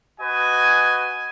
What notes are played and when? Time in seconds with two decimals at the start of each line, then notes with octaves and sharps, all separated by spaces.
0.20 F#4 B4 D#5 G#5